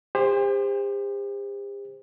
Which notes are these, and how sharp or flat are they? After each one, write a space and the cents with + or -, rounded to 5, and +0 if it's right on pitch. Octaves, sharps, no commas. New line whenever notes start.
G4 +40 C5 +0